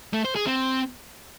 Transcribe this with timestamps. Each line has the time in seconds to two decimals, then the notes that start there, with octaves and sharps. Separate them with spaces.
0.13 A3
0.24 C5
0.35 G#4
0.47 C4